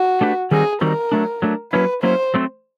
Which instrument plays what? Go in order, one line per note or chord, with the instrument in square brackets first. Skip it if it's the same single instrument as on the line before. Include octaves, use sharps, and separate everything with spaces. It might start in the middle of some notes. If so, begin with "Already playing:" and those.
Already playing: [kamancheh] F#4
[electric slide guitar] A3 D4 G4 B4
[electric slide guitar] D#3 G3 C4 D#4 F#4 [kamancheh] G#4
[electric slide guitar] D#3 G3 C4 D#4 F#4 [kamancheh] A#4
[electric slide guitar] F#3 A3 D4
F#3 A3 D4
[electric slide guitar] F#3 A#3 C#4 E4 [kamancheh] B4
[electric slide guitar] F#3 A#3 C#4 E4 [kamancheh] C5
[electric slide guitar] F#3 A3 C4